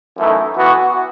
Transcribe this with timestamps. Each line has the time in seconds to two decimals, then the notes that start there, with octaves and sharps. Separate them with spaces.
0.17 F#2 E3 A3 D#4
0.56 E3 B3 F#4